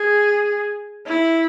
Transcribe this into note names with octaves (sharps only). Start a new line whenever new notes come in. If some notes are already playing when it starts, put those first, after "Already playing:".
Already playing: G#4
E4